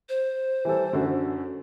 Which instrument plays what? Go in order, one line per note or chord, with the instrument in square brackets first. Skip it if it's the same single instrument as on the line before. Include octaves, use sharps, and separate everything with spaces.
[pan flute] C5
[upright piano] E3 G3 A4
F#2 D3 F#4